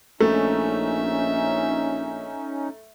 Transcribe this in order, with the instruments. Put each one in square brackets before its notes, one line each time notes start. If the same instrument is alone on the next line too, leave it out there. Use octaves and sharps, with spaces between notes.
[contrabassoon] A#1 [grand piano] A3 [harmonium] C#4 D#4 [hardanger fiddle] E5